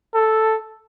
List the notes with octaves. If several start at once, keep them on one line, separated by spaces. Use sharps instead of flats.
A4